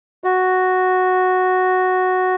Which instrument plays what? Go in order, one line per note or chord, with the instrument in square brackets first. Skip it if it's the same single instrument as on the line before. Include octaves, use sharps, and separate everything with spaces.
[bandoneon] F#4